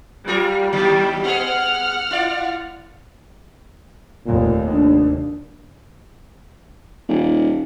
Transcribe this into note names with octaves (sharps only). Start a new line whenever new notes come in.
G3 F4 G#4 A#4
D#2 D#3 F#3 G3
B3 G#4 F#5 F6
E4 F4 D5
F1 D#2 A#2
D4
D#1